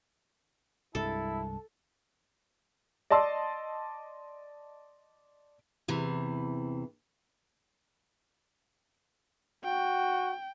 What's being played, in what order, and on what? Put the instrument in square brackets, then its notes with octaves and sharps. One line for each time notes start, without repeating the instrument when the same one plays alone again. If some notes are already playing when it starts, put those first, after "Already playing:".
[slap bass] C2 G2 G#3 [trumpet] E4 [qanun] A4 [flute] A5
[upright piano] D5 D#5 A5 C6 E6
[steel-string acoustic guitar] E2 C3 E3
[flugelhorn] F#4 [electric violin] G5